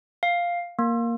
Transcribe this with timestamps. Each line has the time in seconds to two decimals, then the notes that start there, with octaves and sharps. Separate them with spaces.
0.23 F5
0.79 A#3